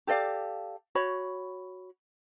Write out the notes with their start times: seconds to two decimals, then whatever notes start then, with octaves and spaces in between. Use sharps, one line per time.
0.07 G4 A4 D5 F5
0.95 F#4 C#5 B5